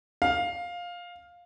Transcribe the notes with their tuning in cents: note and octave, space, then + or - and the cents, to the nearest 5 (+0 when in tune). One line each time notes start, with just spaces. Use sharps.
F5 +10